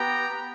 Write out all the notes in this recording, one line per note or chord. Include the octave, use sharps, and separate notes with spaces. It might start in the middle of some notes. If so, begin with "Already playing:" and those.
Already playing: B3 G4 G5 A#5
B3